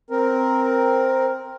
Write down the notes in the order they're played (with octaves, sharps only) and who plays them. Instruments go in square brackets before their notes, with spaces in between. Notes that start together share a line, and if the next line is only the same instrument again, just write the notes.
[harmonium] C4 A#4